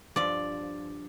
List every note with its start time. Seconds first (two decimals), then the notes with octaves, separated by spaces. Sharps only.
0.16 G2 F3 D5